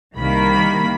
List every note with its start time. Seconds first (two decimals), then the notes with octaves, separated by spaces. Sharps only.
0.17 C2 D#3 A#3 B5